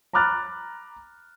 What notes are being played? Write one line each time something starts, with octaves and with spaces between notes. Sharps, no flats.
A#5 B5 D6 F6 F#6 A6